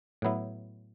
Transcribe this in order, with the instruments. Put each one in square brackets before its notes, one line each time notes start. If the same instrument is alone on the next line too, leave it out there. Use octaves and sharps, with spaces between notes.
[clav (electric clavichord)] A2 F#3 B3 E4